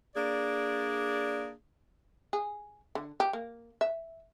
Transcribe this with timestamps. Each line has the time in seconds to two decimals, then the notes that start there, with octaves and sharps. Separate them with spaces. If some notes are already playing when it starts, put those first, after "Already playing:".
0.15 A#3 D4 G#4 D5
2.33 G#4
2.95 D3
3.20 G4
3.33 A#3
3.81 E5